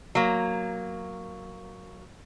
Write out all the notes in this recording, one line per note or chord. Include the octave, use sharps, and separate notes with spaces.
F#3 A#3